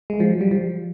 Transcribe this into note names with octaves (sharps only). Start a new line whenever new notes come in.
G#3
F3
F#3
G3
F3